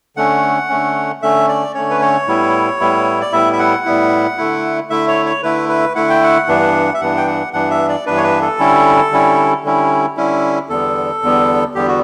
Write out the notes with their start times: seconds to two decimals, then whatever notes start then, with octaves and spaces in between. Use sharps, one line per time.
0.17 D3 A3 C#4 F#5
0.69 D3 A3 C#4
1.22 D3 A3 C#4 E5
1.48 D5
1.74 D3 A3 C#4 C#5
1.90 B4
2.01 C#5
2.27 A2 G3 B3 E4
2.80 A2 G3 B3 E4
3.21 D5
3.33 A2 G3 B3 E4 E5
3.53 E5
3.59 F#5
3.85 A2 G3 B3 E4
4.38 D3 A3 E4
4.90 D3 A3 E4 E5
5.08 C#5
5.26 C#5
5.43 D3 A3 E4 B4
5.69 B4
5.95 D3 A3 E4 F#5
6.10 G5
6.24 F#5
6.48 G2 E3 B3 D4
6.94 E5
7.01 G2 E3 B3 D4 F#5
7.17 G5
7.27 F#5
7.53 G2 E3 B3 D4 F#5
7.71 E5
7.89 D5
8.06 G2 E3 B3 D4 B4
8.17 C#5
8.23 B4
8.42 A4
8.59 D3 G3 C#4 E4
9.12 D3 G3 C#4 E4
9.64 D3 G3 C#4 E4
10.17 D3 G3 C#4 E4
10.69 E2 D3 G3 B3 A4
11.22 E2 D3 G3 B3
11.75 E2 D3 G3 B3 G4
11.88 F#4